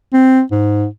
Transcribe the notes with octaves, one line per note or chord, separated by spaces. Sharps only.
C4
G#2